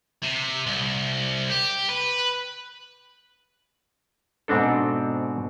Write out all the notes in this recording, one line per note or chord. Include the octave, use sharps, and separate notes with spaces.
C3
C2
G4
B4
G#2 B2 C4 D4 A4